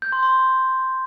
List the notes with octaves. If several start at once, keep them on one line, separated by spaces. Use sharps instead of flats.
G6
C6
C6